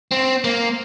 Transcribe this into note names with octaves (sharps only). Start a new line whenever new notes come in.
C4
A#3